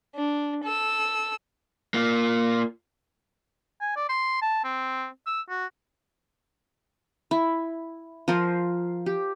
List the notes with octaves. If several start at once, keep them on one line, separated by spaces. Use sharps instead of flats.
D4
A4 E6
A#3 F4
G#5
D5
C6
A5
C4
E6
F#4
E4
F3 F4 A#4 C5
G4